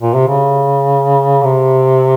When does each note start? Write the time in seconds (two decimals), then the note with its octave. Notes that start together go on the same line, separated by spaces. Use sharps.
0.02 A#2
0.14 C3
0.28 C#3
1.43 C3